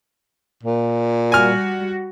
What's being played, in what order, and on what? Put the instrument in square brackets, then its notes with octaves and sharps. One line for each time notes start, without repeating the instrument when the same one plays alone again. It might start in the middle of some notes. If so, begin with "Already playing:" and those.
[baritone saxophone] A#2
[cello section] G3 F#4 [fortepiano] G#5 F6